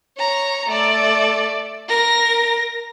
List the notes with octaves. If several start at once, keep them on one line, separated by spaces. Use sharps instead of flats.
C#5 A#5
A3 D5
A#4 A#6